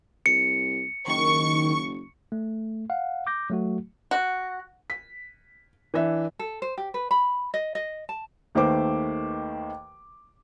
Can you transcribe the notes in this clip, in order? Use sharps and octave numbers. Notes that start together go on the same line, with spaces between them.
C2 C#7
F#1 D#3 C#6
A3
F5 F#5
D6 G6 A#6
F#3 A3 F#4
F#4
B6
E3 D4 E5
A4
C5
G4
B4
B5
D#5
D#5
A5
D#2 D#3 A3 B4 C5 D6